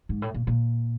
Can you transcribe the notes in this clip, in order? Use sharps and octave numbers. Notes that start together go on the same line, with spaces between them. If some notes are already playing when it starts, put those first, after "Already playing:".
G#2
A2
A#2
A#2